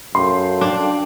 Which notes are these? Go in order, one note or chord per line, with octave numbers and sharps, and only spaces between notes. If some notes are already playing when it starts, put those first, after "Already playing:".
F#2 A4 F5 G5 C6
D4